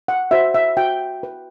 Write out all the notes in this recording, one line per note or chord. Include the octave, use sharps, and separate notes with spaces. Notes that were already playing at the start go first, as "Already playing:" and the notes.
F#5
F#4 C5 E5
E5
F#4 G5
B4